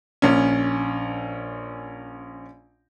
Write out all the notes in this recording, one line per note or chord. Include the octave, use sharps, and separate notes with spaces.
A#1 C#4